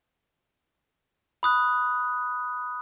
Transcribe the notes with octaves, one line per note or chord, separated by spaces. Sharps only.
B5 D#6 F#6